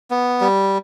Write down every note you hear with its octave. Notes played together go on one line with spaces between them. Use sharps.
B3
G3